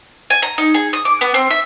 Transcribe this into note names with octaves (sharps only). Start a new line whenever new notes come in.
G#5
A#5
D#4
G#4
D#6
D6
B3
C4
E5